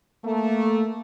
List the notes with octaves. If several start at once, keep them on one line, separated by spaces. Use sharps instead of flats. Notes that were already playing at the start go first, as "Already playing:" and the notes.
A3 A#3